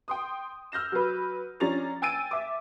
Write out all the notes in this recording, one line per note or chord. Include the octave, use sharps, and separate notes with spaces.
G5 C6 D#6
E6 F6 G6 A#6 E7
F#3 B4
F3 C#4 D4 A#5 A6 F7
G5 G#5 E6 A6 D7 D#7
E5 D6